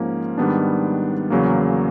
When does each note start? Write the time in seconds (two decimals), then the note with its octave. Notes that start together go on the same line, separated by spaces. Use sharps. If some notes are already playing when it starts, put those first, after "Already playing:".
Already playing: G#2 F3 A#3 C#4
0.38 G#2 D#3 G3 B3 D4
1.30 E2 C#3 F#3 A#3